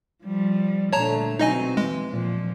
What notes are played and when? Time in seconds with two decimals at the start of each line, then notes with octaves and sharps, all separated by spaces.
0.24 F3 G3
0.93 A#2 D3 A3 C#5 A5 A#5
1.39 B2 F#3 C4 D#4 D#5 G#5
1.77 E3 G#3
2.09 A#2 F3